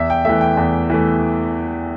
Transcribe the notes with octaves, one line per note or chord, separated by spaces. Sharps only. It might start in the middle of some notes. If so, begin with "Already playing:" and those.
Already playing: E2 E5
G5
E3 A3 E5
G5
E2
E3 A3